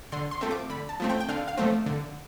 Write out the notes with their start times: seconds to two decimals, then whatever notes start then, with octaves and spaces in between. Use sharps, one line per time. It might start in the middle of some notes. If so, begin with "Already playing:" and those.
0.12 D3 C6
0.31 C6
0.41 F3 A3 C4
0.51 D6
0.70 D3 B5
0.89 A5
1.00 F3 A3 C4
1.10 G5
1.20 G5
1.29 D3 F5
1.48 F5
1.57 F3 A3 C4
1.86 D3